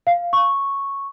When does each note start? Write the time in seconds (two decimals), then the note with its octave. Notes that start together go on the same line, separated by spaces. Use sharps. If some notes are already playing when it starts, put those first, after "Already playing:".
0.07 F5
0.33 C#6